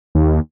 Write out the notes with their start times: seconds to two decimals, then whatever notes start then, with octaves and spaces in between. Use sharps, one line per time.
0.15 D#2